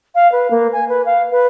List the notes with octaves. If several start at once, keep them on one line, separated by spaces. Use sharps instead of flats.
F5
B4
A#3
G#5
B4
F5
B4